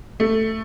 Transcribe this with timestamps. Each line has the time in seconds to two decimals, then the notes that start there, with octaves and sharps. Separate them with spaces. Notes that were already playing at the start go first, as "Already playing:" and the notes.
0.20 A3